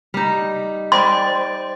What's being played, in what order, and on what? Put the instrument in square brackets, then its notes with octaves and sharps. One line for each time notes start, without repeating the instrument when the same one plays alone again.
[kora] G3 D#4
[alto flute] C5 [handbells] D5 G5 A6 [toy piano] C6